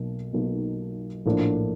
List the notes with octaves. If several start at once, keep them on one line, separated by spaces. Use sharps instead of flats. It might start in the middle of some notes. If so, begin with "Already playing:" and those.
Already playing: B1 B2 F#3 A#3
B1 B2 F#3 A#3 D#4
A#1 A2 F3 A#3 D4